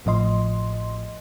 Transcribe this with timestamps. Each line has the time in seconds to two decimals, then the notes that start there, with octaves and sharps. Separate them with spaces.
0.05 A1 A2 F3 D#5 C6